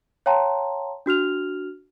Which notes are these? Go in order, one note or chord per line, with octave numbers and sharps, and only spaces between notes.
C#5 F5 G5 A5 A#5 C6
D4 F#4 F6 F7